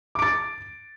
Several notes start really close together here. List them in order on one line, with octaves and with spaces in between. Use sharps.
D6 D7 A6